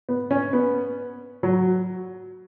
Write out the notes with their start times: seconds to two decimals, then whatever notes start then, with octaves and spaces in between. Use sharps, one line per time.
0.09 B3
0.31 C#4
0.53 B3
1.43 F#3